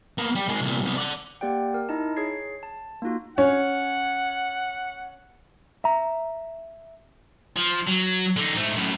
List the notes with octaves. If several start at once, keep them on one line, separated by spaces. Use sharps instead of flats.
A#3 B3
G3
D#3 G#3
C2 A#2
C2 B3
D5 F#5
A#3 G4 D5 F#5 G5
A#4
D#4 E4 D#5 A5
G#4 C#5 G#6 C7
A5
A#3 D#4 F4 F#4
C#4 C#5 F#5
E5 A#5
F3
F#3
D3 D#4
G#2 A3
F#2 A2